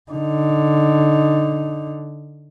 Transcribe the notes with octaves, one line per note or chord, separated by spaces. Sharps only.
D3 D#4